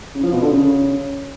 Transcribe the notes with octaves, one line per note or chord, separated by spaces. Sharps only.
C#3
F3
B2
D3
C#3